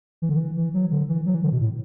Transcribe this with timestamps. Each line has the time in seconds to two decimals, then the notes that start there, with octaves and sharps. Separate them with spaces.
0.22 E3
0.29 D3
0.37 E3
0.57 E3
0.74 F#3
0.91 D3
1.09 E3
1.26 F#3
1.34 E3
1.43 D3
1.52 B2
1.60 A2